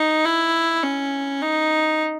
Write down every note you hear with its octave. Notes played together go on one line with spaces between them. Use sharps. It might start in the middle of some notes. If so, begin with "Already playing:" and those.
Already playing: D#4
E4
C#4
D#4